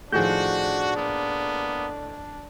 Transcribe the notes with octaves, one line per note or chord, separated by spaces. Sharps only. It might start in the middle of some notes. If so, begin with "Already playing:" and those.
A2 D#3 F3 D4 F#4 G#4 G6
A#3 B3